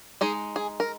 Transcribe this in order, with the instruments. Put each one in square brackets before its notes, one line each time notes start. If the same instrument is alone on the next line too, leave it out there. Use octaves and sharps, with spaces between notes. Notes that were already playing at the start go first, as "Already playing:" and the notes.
[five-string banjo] G#3 D#4 G#4
G#4
A#4